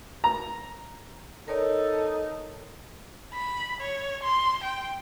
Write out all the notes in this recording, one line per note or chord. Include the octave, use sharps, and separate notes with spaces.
A#5
D#4 A4 A#4 C#5 D5
B5
C#5
C6
G5